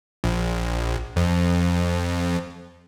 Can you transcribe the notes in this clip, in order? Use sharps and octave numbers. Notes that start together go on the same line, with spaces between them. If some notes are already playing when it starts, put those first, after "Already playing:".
A#1
F2